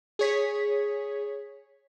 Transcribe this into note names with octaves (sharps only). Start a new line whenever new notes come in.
G#4 C#5 B6